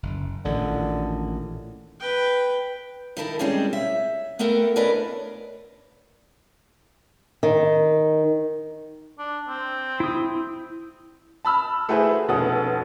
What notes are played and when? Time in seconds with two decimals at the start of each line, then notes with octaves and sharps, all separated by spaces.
0.03 F#1
0.45 A1 A#2 D3 D#3
2.00 B4 G5
3.17 D#3 E4 A4 A#4
3.39 G3 G#3 C4 C#4 G#4
3.73 E5
4.39 A3 B3 A4 A#4 F#5 G5
4.76 C#4 D4 A#4 B4 D5 D#5
7.43 D#3
9.19 D4
9.49 C4
10.00 E4 D#6
11.45 A5 B5 E6 F6
11.89 A3 E4 F#4 G#4 B4 C5
12.28 F1 B2 C#4 A4 F#5 D#6